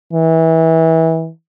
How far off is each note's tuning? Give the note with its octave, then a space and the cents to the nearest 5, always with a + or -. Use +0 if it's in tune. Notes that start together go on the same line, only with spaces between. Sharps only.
E3 -25